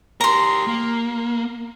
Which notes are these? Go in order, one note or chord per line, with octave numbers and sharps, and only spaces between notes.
G4 A#4 A#5 C6
A#3